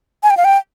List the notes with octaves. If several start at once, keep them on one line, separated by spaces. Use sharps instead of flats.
G#5
G5
F5
G5